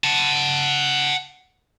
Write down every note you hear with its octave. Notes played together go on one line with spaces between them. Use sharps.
F#5 A5